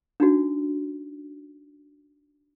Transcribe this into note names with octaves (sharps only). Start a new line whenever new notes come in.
D4 D#4 F#4